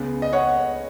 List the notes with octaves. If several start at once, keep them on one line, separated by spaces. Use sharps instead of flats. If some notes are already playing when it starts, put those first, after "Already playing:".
Already playing: C#2 C#3 B3
D#5
C#5 F#5